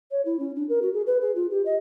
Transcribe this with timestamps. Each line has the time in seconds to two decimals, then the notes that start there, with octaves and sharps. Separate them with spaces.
0.11 C#5
0.25 E4
0.39 C#4
0.56 D4
0.69 A#4
0.82 F#4
0.94 G#4
1.07 B4
1.21 G#4
1.35 F4
1.51 G4
1.66 D#5